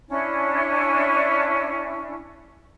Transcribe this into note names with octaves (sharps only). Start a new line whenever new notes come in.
C#4 D4 E4